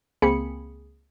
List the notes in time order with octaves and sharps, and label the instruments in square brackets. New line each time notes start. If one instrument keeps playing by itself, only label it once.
[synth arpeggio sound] C#2 A#3 C4 G#4 B5 C#7